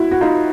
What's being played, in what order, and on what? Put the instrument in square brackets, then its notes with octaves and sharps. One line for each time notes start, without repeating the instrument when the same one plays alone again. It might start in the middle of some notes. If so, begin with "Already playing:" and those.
Already playing: [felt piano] E4 F#4
F#4
D#4 F4